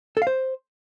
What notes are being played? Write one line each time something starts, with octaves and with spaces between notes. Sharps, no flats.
A4
F5
C5